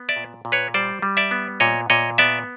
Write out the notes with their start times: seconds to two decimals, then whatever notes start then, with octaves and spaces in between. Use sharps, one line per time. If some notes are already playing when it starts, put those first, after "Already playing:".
Already playing: B3
0.09 D5 E5
0.16 A#2
0.45 A#2
0.52 B4 C#5
0.74 G3 C5 D5
1.02 G3
1.17 D5 E5
1.31 B3
1.60 A#2 C#5 D#5
1.90 A#2 C#5 D#5
2.18 B3 D5 E5